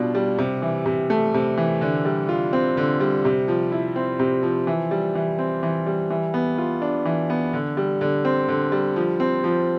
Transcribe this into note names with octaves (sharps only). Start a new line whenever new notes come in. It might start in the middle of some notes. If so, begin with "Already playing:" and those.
Already playing: B2 G3 D4 F4
G3
C3
E3
C3
A3
C3
E3
D3
G3
F4
C4
D3
G3
C3
F3
E4
C4
C3
F3
E3
G3
E3
C4
E3
G3
E3
B3
F4
D4
E3
B3
D3
G3
D3
C4
D3
G3
F3
C4
F3